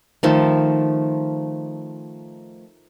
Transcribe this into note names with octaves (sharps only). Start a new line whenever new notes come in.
D#3 F3 A3